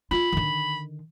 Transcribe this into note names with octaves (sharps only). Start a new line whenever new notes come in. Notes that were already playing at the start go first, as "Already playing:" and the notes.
F4 B5
D3 D#3